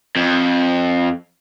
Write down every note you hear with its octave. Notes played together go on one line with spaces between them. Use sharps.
F2